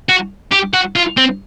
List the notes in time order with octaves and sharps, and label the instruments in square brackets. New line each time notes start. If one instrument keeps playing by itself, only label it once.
[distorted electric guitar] F#4
G4
F#4
F4
C4